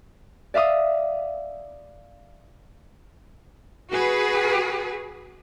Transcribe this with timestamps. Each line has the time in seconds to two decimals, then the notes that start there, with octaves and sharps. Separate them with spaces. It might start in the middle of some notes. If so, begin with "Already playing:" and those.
0.54 D5 E5 F5 D#6
3.91 F#4 G#4 B4